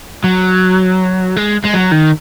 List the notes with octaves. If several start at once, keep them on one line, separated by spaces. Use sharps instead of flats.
F#3
G#3
G#3
F#3
D#3